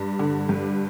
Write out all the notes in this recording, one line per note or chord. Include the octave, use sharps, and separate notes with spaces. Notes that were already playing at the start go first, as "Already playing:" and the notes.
Already playing: G2
D3
G2